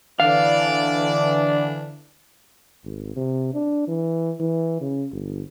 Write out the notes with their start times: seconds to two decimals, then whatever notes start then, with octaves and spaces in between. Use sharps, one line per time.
0.20 D3 E3 D4 D5 F5
2.84 G#1
3.16 C3
3.54 D4
3.88 E3
4.40 E3
4.81 C#3
5.12 G1